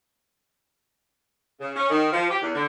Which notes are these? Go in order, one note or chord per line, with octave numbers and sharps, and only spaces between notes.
C#3
C#4
D#3
F3
G4
E2
D3